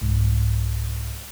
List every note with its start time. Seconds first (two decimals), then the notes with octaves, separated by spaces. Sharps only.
0.01 C2 G#2